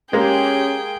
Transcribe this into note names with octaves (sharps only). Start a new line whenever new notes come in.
G#3 A#3 C#4 G4 G#4 G5